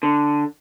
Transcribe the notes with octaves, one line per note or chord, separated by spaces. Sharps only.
D3